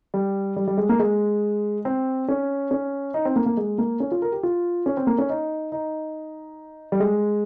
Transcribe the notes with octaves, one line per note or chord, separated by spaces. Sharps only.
G3
G3
G3
G#3
A#3
G#3
C4
C#4
C#4
D#4
C4
A#3
A#3
G#3
A#3
C#4
F4
A#4
G4
F4
C#4
C4
A#3
C#4
D#4
D#4
G3
G#3